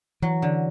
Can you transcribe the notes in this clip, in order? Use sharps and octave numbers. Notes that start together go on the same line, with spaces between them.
E3 F#3
D3